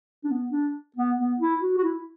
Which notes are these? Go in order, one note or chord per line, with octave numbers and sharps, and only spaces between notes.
D4
B3
D4
B3
B3
E4
F#4
F#4
E4